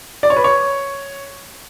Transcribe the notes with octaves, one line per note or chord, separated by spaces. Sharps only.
D5
C#5
B4
C#5